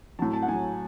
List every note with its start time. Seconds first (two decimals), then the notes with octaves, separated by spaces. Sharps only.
0.19 A2 F#3 A5
0.33 A5
0.42 F#5
0.48 A2 F#3 G#5